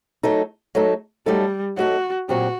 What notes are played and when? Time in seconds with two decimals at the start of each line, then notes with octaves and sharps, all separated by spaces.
0.23 F#3 A3 D#4 A4
0.75 F#3 A3 D#4 A4
1.26 F#3 G3 A3 D#4 A4
1.77 F#3 A3 D#4 F#4 A4
2.29 A#2 F#3 C4 F#4 G4